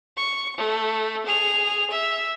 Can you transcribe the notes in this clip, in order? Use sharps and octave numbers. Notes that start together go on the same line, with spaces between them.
C#6
A3
G#4 F7
E5